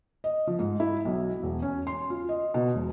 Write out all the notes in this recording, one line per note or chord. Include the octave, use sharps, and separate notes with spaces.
D#5
F3
G#2
E4
B1
E1
C#4
C6
F4
D#5
B2
E1